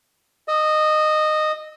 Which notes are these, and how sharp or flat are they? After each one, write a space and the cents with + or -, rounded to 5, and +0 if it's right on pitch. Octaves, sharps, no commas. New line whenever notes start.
D#5 -15 E6 -45